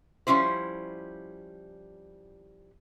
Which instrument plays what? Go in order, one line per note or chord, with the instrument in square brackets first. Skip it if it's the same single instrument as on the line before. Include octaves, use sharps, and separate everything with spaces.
[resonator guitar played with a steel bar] F3 G3 C#4 E4 C5